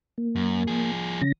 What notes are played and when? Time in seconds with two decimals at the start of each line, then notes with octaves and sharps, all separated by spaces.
0.18 A#3
0.36 F#2
0.68 F3 G#4
1.21 C#3 C#4 A#6